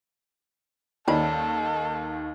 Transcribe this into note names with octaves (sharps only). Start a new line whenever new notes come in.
D#2 D#3 G3 C#4 A4 B5